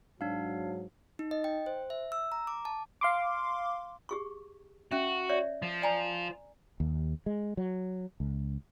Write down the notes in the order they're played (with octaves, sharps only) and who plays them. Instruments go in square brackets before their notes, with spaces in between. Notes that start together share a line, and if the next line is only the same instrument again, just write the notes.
[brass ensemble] G#2 F#3 [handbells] D4 F5
[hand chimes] D#4
D#5
G5
C5
E5
E6
A#5
D6
A5
[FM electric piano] F5 C6 D6
[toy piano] G4 G#4 C#6
[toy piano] C#4 E5 [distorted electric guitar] F#4
[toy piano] C#5 D5 E5
[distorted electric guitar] F3
[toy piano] D5 G#5 A#5
[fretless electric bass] D#2
G#3
F#3
C#2